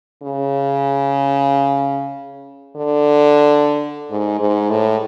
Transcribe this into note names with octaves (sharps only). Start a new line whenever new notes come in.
C#3
D3
G#2
G#2
A2